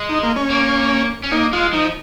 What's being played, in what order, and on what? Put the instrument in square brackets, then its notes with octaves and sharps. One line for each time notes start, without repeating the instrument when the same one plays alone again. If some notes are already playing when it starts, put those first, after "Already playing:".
Already playing: [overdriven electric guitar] G#3
[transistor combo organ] D#4
A#3
C#4
[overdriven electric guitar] A#3
C#4
[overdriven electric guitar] A#3 [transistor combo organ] D#4
[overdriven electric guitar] G#3 [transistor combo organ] F4
[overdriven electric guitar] F3 [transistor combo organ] D#4